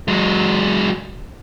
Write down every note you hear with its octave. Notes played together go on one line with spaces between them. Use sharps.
F#3 G#3